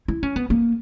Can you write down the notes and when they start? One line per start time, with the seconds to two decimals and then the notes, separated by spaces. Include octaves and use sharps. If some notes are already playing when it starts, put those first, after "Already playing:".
0.08 E4
0.23 C#4
0.36 B3
0.50 A#3